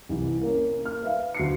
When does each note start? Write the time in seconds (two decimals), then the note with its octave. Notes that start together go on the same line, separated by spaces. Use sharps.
0.09 C2 E3
0.42 A#3 C#4
0.81 A#3 F6
1.03 B4 E5 F5
1.35 D2 C7 C#7